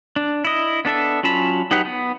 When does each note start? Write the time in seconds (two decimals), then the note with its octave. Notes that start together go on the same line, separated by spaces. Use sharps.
0.16 D4
0.45 E4 D#5
0.85 B3 D4 A4 E5
1.23 F#3 C#4 F4 A5 B5
1.71 F#3 D#4 G4 B4 F#5
1.85 B3